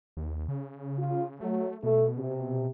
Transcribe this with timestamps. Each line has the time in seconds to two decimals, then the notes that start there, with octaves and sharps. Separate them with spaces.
0.17 D#2
0.48 C#3
0.99 F4
1.41 F#3 A3
1.83 B2 A3
2.18 C3